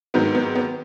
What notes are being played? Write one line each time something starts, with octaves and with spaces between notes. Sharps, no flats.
G#2 D#3 F#3 B3
B3
B3